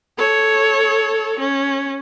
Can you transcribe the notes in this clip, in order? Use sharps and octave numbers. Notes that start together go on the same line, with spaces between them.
A4 C#5
C#4